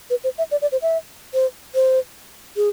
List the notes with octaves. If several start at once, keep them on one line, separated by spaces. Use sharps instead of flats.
B4
C5
E5
D5
D5
C5
E5
C5
C5
G#4